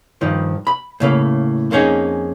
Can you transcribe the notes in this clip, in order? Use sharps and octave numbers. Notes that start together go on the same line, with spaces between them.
G2 D#3 F3
B5
A2 C#3 A#3
F2 A#3 C#4 D#4 G#4